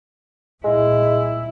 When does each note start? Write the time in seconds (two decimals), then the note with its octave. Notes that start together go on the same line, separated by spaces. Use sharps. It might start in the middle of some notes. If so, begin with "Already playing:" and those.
0.64 A#2 G#3 E4